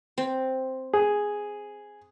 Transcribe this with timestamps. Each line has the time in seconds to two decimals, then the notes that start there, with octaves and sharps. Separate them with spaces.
0.18 C4
0.93 G#4